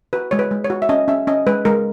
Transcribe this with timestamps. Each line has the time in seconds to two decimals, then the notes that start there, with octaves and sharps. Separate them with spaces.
0.13 F#4 B4
0.31 G#3 C#5
0.39 B4
0.51 G#3
0.64 C#5
0.70 F#4
0.82 E5
0.89 C#4 D#5
1.08 C#4 E5
1.27 C#4 D#5
1.47 G#3 B4
1.65 G#3 A#4